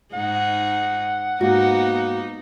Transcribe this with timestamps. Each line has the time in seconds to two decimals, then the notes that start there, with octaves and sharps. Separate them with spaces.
0.13 G#2 D#4 G#4 F#5
1.41 G#2 A#3 B3 D#4 F#4